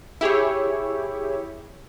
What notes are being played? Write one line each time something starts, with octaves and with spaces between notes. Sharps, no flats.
E4 G4 G#4 C#5